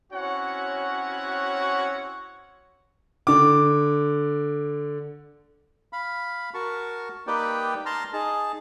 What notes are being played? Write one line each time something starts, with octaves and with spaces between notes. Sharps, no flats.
C4 C#4 E4 F#4 C#5 F#5
D3 D6
F5 B5
F#4 A#4 A5 C#6
A#3 D#4 G4 B4 D5 G5
A5 A#5 C6 F6
D#4 G#4 A5